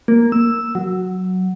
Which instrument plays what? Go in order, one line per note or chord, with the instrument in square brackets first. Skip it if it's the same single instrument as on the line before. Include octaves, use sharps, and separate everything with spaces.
[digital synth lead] A#3
E6
F#3